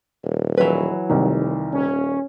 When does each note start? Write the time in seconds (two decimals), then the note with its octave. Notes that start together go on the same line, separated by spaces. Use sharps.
0.24 D#1
0.58 E3 F#3 B4
1.09 F1 C2 D#3
1.73 D#1 C#4